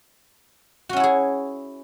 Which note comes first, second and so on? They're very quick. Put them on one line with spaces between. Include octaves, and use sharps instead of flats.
F#4 C#4 E4 C#5 G#4